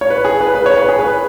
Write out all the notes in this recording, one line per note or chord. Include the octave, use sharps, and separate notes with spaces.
C#5
B4
G#4
B4
B4
C#5
B4
G#4
B4